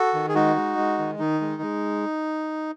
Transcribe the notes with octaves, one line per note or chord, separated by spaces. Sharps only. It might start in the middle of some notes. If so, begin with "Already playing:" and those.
Already playing: F#4 A4
D#3
G#4
G#3 D#4 F#4
G#3
G#3
D#3
D#3 D#4
G#3
G#3